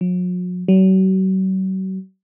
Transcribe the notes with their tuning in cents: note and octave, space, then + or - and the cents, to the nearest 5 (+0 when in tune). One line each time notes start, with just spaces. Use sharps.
F#3 -45
F#3 +40